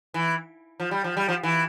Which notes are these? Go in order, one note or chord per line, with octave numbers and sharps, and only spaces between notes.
E3
F3
G3
F3
G3
F3
E3